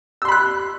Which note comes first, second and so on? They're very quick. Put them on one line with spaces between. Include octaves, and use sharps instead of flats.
E6 C6 B5 F#6